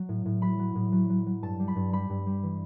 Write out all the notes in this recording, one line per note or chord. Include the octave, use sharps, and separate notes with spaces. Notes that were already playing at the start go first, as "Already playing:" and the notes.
Already playing: F#3
A2
A2
F#3 B5
F#3
A2
F#3
F#3
F#3
G2 A5
G3
B5
G2
G3 B5
G2
G3
E3